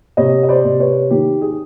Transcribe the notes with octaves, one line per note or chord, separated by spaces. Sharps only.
C3 C#5 D#5
D#5
C5 D5
C3
B4 C#5
D#3 G4
G#4